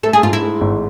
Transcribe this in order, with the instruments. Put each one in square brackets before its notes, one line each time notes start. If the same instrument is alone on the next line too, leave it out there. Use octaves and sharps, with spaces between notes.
[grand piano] A3 [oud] A4
[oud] G#4
[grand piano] G#2 [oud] F4
[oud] E4
[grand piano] G#3
G#1